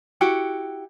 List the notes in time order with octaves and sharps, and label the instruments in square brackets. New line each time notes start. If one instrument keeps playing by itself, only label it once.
[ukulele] E4 F#4 G4 F#5